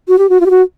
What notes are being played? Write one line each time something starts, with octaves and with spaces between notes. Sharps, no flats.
F#4
G4
F#4
F4
G4
F#4